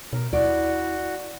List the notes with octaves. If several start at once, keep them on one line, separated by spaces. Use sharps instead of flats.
B2 A#4
D#2 E4 F#4 D5